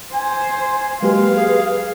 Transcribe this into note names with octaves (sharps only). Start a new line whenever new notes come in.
C5 G#5
F#3 G#3 A#3 G4 B4 F5
G#4